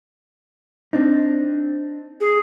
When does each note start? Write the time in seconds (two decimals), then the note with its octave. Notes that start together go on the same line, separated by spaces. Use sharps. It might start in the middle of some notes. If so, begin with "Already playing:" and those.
0.93 C4 D4 D#4
2.20 G#4